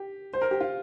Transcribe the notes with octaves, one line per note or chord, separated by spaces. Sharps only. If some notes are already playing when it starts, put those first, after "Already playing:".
Already playing: G4
C5
A#4
G4
F4